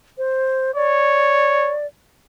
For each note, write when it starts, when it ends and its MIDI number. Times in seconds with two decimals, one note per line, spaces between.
0.18 0.71 72
0.76 1.74 73
0.76 1.86 74